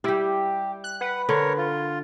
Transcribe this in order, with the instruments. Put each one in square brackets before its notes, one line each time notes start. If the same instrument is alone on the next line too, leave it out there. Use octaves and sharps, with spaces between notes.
[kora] G3 E4 [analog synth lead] G4
[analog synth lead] F#6
[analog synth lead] B4 [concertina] F#5
[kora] D3 [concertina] A#4 C#5
[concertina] F4